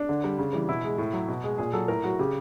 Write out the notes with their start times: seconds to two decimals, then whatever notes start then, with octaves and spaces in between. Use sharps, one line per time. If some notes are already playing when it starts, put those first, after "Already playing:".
Already playing: D4
0.09 D3
0.24 G3
0.39 C#3
0.53 E3 G3
0.69 B2 E4
0.84 G#3
0.98 A2
1.13 F#3
1.28 B2
1.44 G#3
1.58 A#2 G#4
1.73 F#3 A4
1.88 A2 A#4
2.04 F#3 F#4
2.19 C#3 G4